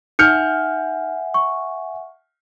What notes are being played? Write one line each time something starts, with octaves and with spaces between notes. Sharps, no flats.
D#4 E5 F#5 G#5 F6 G6 C#7
C#6